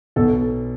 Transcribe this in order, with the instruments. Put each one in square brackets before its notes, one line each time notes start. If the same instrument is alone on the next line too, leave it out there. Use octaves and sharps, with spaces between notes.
[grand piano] B1 B2 A4